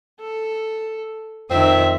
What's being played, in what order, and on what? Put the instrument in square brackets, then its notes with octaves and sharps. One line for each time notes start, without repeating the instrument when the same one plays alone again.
[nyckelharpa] A4
[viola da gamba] F2 D#3 [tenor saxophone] C4 [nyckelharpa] E5